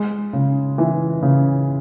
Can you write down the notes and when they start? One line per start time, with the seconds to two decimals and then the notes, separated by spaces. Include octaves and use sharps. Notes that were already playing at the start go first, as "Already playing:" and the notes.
Already playing: G#3
0.33 C#3
0.78 E3
1.22 C#3